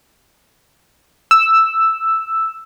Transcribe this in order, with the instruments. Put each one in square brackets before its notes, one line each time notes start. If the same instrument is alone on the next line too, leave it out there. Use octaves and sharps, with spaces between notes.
[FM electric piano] E6